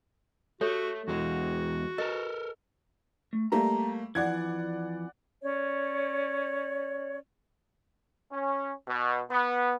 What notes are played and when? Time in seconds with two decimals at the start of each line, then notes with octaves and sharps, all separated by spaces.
0.61 A3 F#4 G4 A4 C#5
1.08 E2 G#3 F#4
1.98 A4 A#4 D#5
3.33 A3
3.52 G3 A3 A#3 A#5
4.15 F2 E3 D5 F#5 G#6
5.43 C#4 C#5 D5
8.31 C#4
8.88 B2
9.31 B3